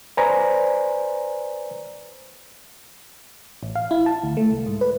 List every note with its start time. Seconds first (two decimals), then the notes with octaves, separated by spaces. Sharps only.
0.17 B4 C5 D5 G#5 A#5
3.63 A1
3.76 F5
3.91 E4
4.06 A5
4.23 D2
4.37 A3
4.51 C2
4.66 G#2
4.81 B4